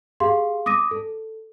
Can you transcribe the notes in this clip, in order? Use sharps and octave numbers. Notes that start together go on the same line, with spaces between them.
G4 G#4 F5 C6
D6 D#6 A#6 D#7
A4